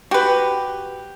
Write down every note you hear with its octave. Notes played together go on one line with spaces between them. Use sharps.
F#4 G4 B4